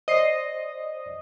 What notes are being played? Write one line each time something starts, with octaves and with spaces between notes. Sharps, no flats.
C5 D5 D#5 C7